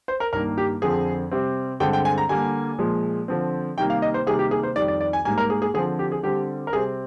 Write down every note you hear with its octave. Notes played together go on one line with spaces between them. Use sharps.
C5
A#4
G2 D#3 A#3 A#4
G4
F2 D3 F3 C4 G#4
C3 G3 C4
G2 D3 G#3 C4 G5
G5
G#5
A#5
D3 G3 A#3 G#5
A#2 F3 G#3
D3 F3 C4
C3 D#3 G3 A#3 G5
F5
D#5
C5
C3 D#3 G3 A#3 G#4
G4
G#4
C5
F2 D#3 G3 D5
D5
D5
G#5
G#2 G3 A#3 G#5
A#4
G#4
G#4
D3 F3 C4 G#4
G4
G#4
D3 G3 C4 G4
A#4
C3 G3 C4 G#4